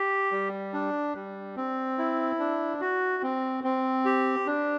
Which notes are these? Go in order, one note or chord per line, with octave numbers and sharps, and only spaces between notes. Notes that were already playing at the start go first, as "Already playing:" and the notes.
Already playing: G4
G3
D4
G3
C4
E4
D4
F#4
C4
C4
G4
D4